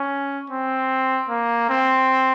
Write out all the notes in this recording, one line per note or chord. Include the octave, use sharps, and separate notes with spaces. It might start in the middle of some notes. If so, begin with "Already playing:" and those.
Already playing: C#4
C4
A#3
C4